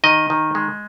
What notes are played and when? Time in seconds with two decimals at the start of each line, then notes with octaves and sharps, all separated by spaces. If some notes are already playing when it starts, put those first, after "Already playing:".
0.04 D#3 D#5
0.30 D#3
0.55 G#3